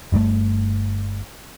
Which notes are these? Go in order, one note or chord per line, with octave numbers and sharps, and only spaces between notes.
G1 G2 C#3 A3